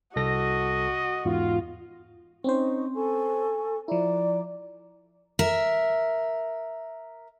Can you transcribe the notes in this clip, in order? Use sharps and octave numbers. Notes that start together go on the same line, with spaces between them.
C2 F#4 A4 D#5 A#6
E2 G#2 F4
C4 C#4 D#4 C5 C#6
A4 G#5 C#6
F3 E4 D5 A#5 D6
A#4 E5